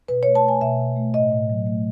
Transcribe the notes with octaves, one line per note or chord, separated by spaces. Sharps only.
B2 B4
A3 C#5
A5
A3 G#5
B2 E5
B2
A3
A2 D#5
A2
F#3
A3